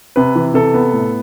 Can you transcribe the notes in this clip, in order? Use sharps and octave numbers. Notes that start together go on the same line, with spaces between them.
C3 B4
E3
C3 A4
B3
A2